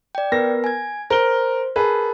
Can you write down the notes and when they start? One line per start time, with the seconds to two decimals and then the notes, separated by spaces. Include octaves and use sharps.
0.15 D5 G5
0.32 B3 A#4 B4 A#6
0.64 G#5 G#6
1.10 A#4 C5 G7
1.76 G#4 A#4 B4 A5